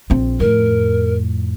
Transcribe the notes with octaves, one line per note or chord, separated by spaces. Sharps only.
A#1 C4
F2 A2 A#4